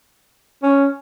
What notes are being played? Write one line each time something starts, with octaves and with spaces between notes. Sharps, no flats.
C#4